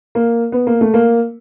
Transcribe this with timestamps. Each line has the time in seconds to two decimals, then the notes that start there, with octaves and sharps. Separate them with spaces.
0.15 A#3
0.52 B3
0.67 A#3
0.81 A3
0.94 A#3